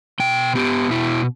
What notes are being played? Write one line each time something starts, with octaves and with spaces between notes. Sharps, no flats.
B2 G5
B3 G4
B2 E4